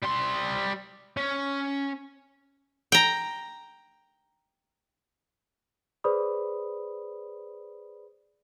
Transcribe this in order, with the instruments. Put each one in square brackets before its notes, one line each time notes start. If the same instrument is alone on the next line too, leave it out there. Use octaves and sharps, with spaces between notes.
[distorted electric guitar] G3 C6
C#4
[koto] G5 A#5
[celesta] G#4 B4 C5 D5 B5 D#6